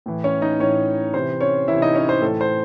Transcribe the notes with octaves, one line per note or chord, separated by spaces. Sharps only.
A2 E3
C#4 C#5
D#4 D#5
A2 E3 C#4 C#5
C3 E3 C5
C#4 C#5
C3 E3 E4 E5
D#4 D#5
C#4 C#5
C5
A2 E3 A4
C5